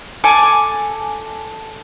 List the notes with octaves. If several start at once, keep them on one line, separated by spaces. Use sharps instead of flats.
A4 G#5 D6